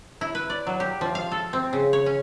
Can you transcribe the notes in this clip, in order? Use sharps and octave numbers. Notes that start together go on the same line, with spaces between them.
E4
B4
D5
F#3
G4
F3
F5
A4
C4
C#3
C#5
C#4